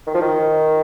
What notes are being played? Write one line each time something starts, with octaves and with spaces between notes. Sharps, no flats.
D#3
F3
D#3